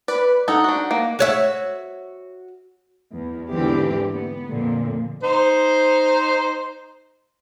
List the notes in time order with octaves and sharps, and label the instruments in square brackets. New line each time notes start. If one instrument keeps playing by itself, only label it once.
[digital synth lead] B4 [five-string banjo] D5
[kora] D#4 [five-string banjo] A4 [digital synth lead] F#5
[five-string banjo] D4 F#4
A#3
[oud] F#4 C#5 E5
[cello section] E2
E2 G#2 D3 E3 C4 G4
B3
F2 A#2 D3
[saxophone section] D#4 C5